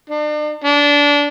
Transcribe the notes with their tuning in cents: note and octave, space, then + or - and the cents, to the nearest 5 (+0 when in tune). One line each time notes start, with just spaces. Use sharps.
D4 +40
D4 -20